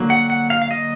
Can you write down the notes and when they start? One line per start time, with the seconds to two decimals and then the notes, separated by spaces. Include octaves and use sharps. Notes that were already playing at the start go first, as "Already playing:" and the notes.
Already playing: D3 F#3 A#3
0.10 F#5
0.30 F#5
0.50 F5
0.62 F5
0.71 D#5